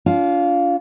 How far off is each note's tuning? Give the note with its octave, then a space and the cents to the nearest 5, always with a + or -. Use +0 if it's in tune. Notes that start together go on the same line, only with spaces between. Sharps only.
D4 -45 F4 +0 F5 +0